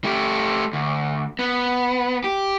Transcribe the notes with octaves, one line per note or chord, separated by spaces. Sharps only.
A3 G4
D2
B3
G4